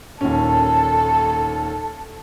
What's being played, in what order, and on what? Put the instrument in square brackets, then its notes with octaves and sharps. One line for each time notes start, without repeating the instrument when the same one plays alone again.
[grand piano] D#2 A#2 C#4 [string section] A4